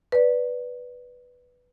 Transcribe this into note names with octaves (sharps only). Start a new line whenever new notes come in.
B4 D5